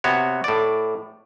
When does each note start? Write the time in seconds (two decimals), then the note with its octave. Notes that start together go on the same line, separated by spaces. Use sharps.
0.04 C3 B3 F#4 C#5
0.44 A2 D5